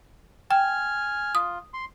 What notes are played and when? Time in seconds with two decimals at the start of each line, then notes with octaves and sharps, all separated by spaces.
0.51 G5 G#5 F6
1.35 F4 D#6
1.73 C6